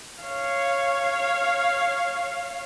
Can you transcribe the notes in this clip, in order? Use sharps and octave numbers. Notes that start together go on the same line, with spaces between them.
C#5 F5